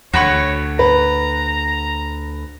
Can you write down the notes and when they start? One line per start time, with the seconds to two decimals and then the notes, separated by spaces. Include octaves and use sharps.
0.14 D2 F#4 C#5 B5 C#6
0.79 B4 A#5